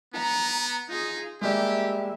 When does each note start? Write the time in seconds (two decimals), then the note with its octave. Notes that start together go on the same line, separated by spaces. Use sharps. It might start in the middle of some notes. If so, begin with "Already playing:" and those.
0.14 B3 A#5
0.89 D#4 F4 G#4
1.41 G3 G#3 A#3 G4 E5